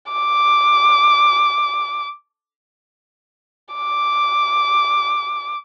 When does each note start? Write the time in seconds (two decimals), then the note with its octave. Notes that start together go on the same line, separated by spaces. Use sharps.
0.12 D6
3.75 D6